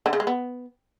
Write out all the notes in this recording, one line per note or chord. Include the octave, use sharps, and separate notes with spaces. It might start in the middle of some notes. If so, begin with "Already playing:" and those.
D3
C#3
G#3
B3